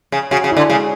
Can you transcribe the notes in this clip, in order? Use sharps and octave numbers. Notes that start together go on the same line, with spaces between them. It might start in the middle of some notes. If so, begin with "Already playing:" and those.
C#3
C#3 F#4
C#3
E4
D3
C#3 G#3